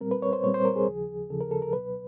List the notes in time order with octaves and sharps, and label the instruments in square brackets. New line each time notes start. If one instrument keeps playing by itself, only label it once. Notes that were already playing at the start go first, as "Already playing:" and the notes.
[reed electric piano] A#2 G3 C4 A#4
B4
C#5
C5
A#2 G3 C4 C#5
C5
A#4
G#4
D#2 C#3 F3
D#2 C#3 F3 A4
A#4
A4
A#4
C#2 B2 F#3 B4